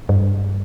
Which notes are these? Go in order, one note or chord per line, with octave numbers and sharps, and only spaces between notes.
G2